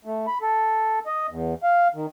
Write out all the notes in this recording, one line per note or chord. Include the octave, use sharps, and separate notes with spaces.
A3
B5
A4
D#5
E2
F5
D#3